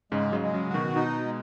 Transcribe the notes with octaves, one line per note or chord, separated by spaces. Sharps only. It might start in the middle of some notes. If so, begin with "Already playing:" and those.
G#2 C#3 G#3
C#3 F#3
G#3
C#3 F#3
F#3 F#4
B2 D#3
B2 D#4
G#3